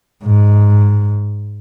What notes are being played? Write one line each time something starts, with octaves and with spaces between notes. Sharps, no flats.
G#2